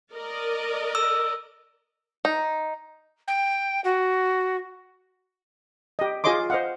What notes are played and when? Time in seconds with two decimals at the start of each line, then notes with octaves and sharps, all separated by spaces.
0.13 A#4 D5 D#5
0.95 E6
2.25 D#4
3.27 G5
3.84 F#4
5.99 G4 D#5
6.24 F4 G#4 C#5 D#5 C6 D6
6.50 C5 D#5 F5 F#5